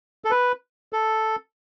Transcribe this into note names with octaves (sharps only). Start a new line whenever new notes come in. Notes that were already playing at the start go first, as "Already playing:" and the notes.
A4
B4
A4